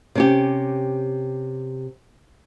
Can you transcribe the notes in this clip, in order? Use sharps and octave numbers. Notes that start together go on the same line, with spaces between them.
C3 C#4 G4